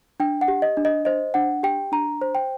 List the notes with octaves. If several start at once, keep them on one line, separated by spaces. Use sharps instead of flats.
D4 G5
F#5
G4
D#5
D4
D#5
C5 D#5
D4 F#5
G4 G5
D4 A#5
C5
G5